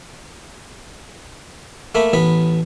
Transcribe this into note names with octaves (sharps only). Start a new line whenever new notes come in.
A3 A#3 B5
A1 B3 B5